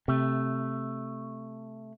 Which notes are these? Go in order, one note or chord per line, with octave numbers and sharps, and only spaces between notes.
C3 A3